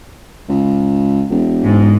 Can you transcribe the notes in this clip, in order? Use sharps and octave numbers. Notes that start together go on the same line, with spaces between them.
C#2
E1
G#2